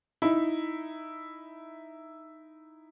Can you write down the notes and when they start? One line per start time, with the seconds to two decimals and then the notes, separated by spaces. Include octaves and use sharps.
0.22 D#4 E4